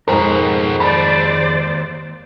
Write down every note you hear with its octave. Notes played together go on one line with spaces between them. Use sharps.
B1 F2 G#2 B2 G#3 A#4
D#2 C5 D5 B5